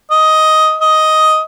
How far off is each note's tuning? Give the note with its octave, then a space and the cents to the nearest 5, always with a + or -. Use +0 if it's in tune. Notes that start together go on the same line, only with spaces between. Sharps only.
D#5 +10
D#5 +5